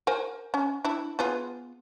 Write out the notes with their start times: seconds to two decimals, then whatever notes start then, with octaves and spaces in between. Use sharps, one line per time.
0.07 A#4 C5 G#5
0.54 C#4
0.85 D4 E4
1.19 B3 F4 G#4